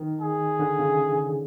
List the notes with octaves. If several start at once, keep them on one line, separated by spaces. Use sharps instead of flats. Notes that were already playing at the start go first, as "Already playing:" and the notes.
Already playing: D#3
G#4
D3
C#3